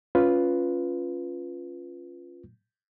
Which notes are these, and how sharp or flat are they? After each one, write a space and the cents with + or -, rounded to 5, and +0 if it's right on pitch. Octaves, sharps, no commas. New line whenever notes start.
C#4 +0 F4 +0 B4 +0